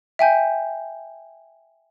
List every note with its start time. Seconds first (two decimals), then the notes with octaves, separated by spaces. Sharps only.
0.19 E5 G5 G#5 G6